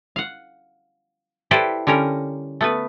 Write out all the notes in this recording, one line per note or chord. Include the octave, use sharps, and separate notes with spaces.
F5 F#5
E4 G4 A4 B4 C5 D5
D3 G3 C#4 A#4
A3 B3 B4